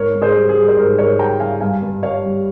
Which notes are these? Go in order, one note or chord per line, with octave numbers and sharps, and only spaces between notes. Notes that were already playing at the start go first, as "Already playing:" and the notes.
Already playing: G#2 A#4 C#5
G#2
G#4 C5
G3
G#4
G3
C5
G#2 A#4
G#2 A#4 C#5
G3 G5 A#5
A#5
G3 F5 G#5
G2 F5 G#5
G2
G3 C#5 F5
G3